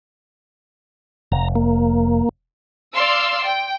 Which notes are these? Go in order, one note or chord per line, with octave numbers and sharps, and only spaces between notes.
F1 A#5
A#3
D5 F5 C6 E6
G5